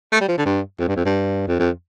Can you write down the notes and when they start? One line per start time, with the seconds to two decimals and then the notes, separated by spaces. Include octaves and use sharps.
0.12 A3
0.21 G3
0.28 F3
0.38 D3
0.45 G2
0.79 F2
0.88 G2
0.96 F2
1.05 G2
1.48 F2
1.59 F2